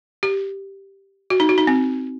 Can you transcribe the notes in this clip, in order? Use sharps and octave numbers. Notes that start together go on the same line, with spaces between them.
G4
F#4
D#4
F#4
D#4
C4